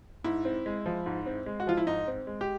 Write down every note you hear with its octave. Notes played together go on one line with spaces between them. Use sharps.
G#2 E4
C4
G#3
F3
G#2
C4
G#3
F#4
F3 F4
E4
G#2 D#4
C4
G#3
G4